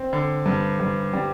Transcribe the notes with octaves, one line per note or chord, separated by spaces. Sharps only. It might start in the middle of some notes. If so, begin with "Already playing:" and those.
Already playing: C4
D3
G2
G2
G3